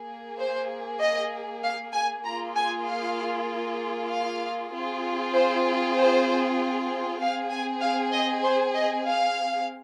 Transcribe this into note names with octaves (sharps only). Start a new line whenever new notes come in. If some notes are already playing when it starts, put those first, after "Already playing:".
Already playing: A#3 G#4
C5
D#5
F5
G#5
A#3 F4 G#4 A#5
G#5
F5
F5
C4 F4 G#4
C5
C5
C4 G#4 F5
G#5
F5
D#5
C5
D#5
F5